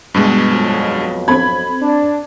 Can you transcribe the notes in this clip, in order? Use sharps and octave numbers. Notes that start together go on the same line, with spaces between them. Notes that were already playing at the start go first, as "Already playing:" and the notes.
G2 B2 G#3
B1 F2
C4 A4 B5 G#6
D4